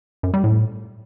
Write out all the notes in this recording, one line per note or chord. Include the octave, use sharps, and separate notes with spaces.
F#2
G3
A2